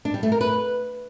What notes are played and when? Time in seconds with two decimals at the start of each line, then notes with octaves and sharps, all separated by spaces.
0.05 D4
0.14 G3
0.23 A3
0.32 A#4
0.41 B4